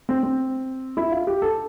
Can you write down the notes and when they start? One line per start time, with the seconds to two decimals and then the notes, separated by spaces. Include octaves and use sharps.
0.09 C4
0.23 C4
0.97 E4
1.12 F4
1.27 G4
1.42 A4